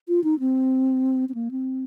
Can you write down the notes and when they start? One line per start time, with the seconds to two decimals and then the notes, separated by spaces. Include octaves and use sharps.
0.08 F4
0.24 D#4
0.40 C4
1.29 C4
1.34 A#3
1.51 C4